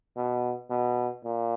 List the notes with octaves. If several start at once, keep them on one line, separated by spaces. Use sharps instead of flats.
B2
B2
A#2